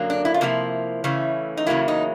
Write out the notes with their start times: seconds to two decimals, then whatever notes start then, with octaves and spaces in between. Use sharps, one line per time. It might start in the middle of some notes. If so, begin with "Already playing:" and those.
Already playing: F#2 D3 F#3 A#3
0.10 D4
0.25 E4
0.34 F4
0.41 C3 F3 A#3 E4
1.04 C#3 E3 A3 C#4
1.57 D#4
1.66 E2 C#3 F#3 A#3 E4
1.88 D#4